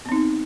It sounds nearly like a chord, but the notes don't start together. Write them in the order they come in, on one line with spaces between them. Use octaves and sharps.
B3 C4 D#4